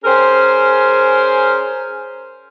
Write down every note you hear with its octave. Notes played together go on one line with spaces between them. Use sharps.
C#4 G#4 A#4 C5